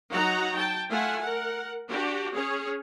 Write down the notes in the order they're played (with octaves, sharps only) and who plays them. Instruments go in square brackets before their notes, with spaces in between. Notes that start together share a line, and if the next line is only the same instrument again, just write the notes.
[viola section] F#3 D#4 F#4 F#5 A#5
G5 A5
A3 F4 E5 F#5 G#5
A#4 F#5
D4 F#4 G4
C#4 G#4 C#5